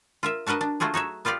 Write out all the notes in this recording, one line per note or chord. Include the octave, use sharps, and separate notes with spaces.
F4 A#4 E5
D4 F#4 A#4 B4 D#5
D4
F#3 A3 F4 F#4 G#4
D#4 F#4 C#5 E5
B3 F4 G4 D5 F5